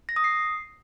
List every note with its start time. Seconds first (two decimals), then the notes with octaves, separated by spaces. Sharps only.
0.09 A#6
0.16 D#6
0.24 C7